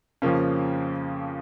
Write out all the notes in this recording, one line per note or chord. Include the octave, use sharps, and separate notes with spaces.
F2 C#3 F3 A#3 C#4